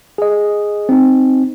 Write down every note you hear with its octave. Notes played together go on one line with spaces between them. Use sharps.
G#4 D#5
C4 D#4